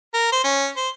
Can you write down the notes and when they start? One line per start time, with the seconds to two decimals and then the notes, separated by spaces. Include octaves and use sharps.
0.14 A#4
0.32 C5
0.44 C#4
0.77 C5